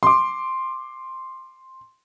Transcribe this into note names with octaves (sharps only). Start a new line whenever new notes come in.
C6 D6